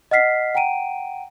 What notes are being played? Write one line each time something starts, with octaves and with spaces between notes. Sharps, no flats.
D#5 F#5 F6 B6 C7
F#5 G5 A#5 D7 D#7